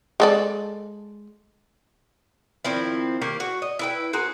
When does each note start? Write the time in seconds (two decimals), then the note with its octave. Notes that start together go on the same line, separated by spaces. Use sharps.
0.20 G#3 A4 D5
2.65 D#3 F3 C4 E4
3.21 D#3 A#3 G4
3.40 F#4
3.62 D#5
3.79 E4 B4 G5
4.13 C4 F#4 G#4 A#4